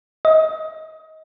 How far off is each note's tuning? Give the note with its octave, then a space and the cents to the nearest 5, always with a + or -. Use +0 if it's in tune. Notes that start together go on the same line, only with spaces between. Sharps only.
D#5 +25